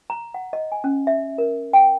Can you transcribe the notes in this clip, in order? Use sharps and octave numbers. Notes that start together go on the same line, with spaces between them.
A#5
F#5
D#5
G#5
C#4
E5
A#4
G5